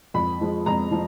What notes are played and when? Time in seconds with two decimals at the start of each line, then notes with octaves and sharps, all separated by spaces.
0.14 F2 B5
0.41 F3 G#3
0.66 F2 A#5
0.92 F3